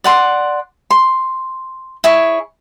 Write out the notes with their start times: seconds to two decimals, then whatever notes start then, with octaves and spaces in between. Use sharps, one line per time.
0.04 D5 F#5 C6
0.91 C6
2.04 E4 G#4 C#5